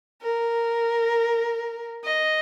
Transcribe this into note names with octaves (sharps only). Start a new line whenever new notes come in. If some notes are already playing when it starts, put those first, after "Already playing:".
A#4
D#5